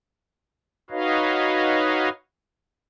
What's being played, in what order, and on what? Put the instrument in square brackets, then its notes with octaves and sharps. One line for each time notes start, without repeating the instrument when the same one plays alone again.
[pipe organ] D#4 F#4 B4 C#5 D#5 F5